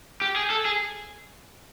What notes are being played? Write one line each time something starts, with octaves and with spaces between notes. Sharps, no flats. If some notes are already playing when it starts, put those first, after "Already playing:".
G4
G#4
A4
G#4